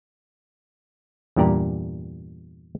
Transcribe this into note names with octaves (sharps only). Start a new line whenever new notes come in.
E2 G2 A#2 G4 D5 A#5